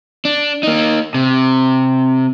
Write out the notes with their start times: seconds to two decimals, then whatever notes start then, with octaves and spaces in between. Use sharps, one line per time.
0.25 D4
0.63 A#3 D#4
1.14 C3